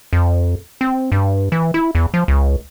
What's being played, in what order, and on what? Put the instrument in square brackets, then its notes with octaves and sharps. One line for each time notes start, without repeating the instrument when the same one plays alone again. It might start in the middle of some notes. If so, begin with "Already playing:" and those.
[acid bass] F2
C4
G2
E3
E4
E2
F3
C#2